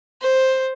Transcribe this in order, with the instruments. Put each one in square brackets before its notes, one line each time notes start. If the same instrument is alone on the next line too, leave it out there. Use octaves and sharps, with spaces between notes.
[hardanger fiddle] C5